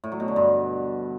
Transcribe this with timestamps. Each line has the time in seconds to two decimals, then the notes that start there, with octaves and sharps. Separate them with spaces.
0.04 A2
0.12 F#3
0.20 B2
0.28 D3
0.36 G2